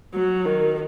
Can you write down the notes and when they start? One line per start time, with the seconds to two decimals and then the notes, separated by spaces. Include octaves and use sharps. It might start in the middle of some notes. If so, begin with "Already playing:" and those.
0.14 F#3
0.45 D#3